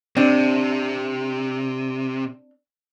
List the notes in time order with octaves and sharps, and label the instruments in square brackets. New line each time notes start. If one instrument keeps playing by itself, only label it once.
[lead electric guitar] C3 [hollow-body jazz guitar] C4 D4